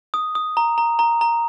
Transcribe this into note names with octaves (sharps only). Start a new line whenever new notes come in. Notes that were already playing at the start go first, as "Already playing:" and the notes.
D#6
D#6
A#5
A#5
A#5
A#5